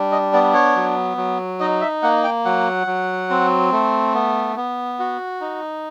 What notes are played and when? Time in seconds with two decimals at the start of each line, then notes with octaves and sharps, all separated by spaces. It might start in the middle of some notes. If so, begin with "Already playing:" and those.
Already playing: G3 D4
0.12 D#5
0.33 B3 D5
0.54 C#5
0.75 F#3
1.17 F#3
1.60 D#4 D#5
1.81 E5
2.03 A#3 F#5
2.24 G5
2.45 F#3 F#5
2.87 F#3
3.30 C4
3.72 A3
4.15 B3
4.56 B3
4.99 F#4
5.41 D#4